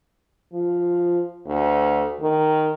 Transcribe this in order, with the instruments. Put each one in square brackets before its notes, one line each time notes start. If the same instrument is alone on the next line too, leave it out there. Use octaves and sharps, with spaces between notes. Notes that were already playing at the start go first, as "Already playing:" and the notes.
[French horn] F3
D2
D#3